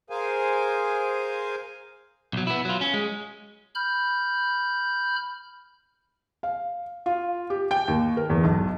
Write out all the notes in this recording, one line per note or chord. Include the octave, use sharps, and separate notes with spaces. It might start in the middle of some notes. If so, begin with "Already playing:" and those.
G#4 A#4 C5 F5 G#5
B1 F#3
B3 E4
F#3 F4
C#4
G#3
B5 F6 G6
F5
F4
G4
G5
D#2
A#4
E2
B1